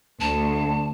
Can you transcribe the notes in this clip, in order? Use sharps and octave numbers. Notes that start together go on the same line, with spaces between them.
D2 A5